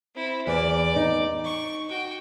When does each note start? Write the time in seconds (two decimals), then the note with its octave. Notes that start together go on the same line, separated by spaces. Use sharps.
0.15 C4 E4
0.47 E2 D5
0.96 D#4
1.44 C#6
1.88 F#4 G5